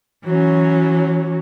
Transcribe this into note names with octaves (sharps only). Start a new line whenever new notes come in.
E3 F#3 C#4